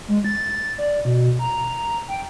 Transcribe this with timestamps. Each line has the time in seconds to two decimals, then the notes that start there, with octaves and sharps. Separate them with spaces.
0.08 G#3
0.24 A6
0.78 D5
1.05 B2
1.39 A#5
2.08 G5